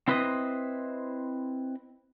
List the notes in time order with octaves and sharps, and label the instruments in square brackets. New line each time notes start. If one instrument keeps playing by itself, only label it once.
[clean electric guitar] C4 E4 B4 C5 D#5